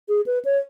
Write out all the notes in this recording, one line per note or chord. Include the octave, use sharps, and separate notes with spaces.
G#4
B4
C#5